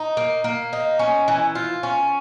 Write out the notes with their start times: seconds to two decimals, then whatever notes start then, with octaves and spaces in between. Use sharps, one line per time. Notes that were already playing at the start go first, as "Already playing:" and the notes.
Already playing: D#4
0.17 A#3
0.44 A#3
0.73 D#4
0.99 C#4
1.28 E3
1.55 F4
1.83 C#4